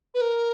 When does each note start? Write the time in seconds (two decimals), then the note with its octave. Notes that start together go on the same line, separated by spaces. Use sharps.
0.14 B4
0.21 A#4